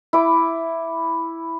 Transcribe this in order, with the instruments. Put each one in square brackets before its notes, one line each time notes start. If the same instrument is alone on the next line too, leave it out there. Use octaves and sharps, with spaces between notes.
[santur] E4 D6